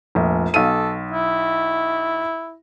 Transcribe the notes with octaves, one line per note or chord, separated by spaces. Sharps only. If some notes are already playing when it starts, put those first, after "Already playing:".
F1 A#1
B1 A4 F5 D#7
E4